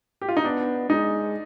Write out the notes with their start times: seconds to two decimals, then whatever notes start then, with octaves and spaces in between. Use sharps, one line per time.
0.22 G4
0.29 F4
0.37 D#4
0.44 B3 D4
0.89 G#3 D#4